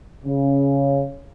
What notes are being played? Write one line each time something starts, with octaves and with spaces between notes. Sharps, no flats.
C#3